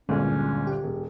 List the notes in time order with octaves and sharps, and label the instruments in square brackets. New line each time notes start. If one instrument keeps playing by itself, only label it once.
[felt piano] G1 D2 A#2 [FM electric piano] G#3 [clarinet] C#4
[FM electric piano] G4
[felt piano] E1